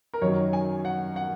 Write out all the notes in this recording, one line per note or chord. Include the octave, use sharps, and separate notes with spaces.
A#4
F#2 D#3 F#3 C#5
G#5
F#5
F#5